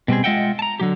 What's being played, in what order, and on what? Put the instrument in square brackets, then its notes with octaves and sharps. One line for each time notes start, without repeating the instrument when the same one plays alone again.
[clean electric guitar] B2 G3 C4 G#4
G#3 F4 D#5 E5 F#5 G5
A5 A#5
D3 F#3 G4